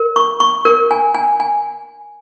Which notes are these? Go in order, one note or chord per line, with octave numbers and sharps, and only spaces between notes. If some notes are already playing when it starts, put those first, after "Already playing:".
Already playing: A#4
C#6
C#6
A#4
G#5
G#5
G#5